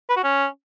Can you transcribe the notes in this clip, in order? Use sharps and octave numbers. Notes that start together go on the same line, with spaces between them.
B4
F#4
C#4